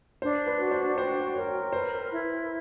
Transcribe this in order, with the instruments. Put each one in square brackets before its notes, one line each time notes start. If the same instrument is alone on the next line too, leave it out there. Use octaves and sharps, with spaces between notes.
[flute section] D4 [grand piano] C5
[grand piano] B4
[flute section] F#4
[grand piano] C5
[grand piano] C5 [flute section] G5
[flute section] A#4 [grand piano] C#5
[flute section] B4 [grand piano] C5
[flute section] E4